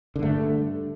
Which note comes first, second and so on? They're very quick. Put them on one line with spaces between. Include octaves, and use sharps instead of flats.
D3 G2 A3